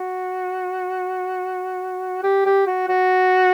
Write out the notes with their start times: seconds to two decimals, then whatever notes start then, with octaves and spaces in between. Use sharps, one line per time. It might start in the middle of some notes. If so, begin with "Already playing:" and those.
Already playing: F#4
2.23 G4
2.46 G4
2.67 F#4
2.89 F#4